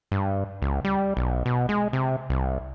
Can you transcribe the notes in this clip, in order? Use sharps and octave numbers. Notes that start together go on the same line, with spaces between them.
G2
C#2
G3
B1
B2
G#3
C3
C2